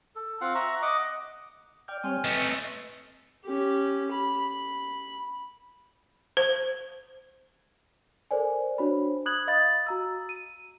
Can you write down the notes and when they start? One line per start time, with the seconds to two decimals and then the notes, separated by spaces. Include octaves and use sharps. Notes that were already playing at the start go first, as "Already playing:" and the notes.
0.15 A4
0.41 C4 F4 F5 F#5
0.55 E5 F#5 A#5 C#6
0.82 D#5 F#5 D6
1.88 D5 G5 F6 G6
2.04 G3 C4 C#5 G#5 C6 F6
2.24 A3 C4 C#4 B4 D#5
3.45 C#4 G4
4.12 B5
6.37 C5
8.31 A4 A#4 C5 D5 G#5
8.78 D4 F#4 C5 C#5 B5
9.26 B5 D#6 F#6 G#6 F#7
9.47 D#5 F5 B5 D#6 A6
9.87 F#4 A#5 E6
10.29 D#7